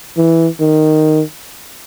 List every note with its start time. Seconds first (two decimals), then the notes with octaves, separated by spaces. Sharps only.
0.17 E3
0.60 D#3